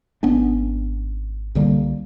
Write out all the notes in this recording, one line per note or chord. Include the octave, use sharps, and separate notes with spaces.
G#1 B3 C#4 D4
C2 D3 G3 A#3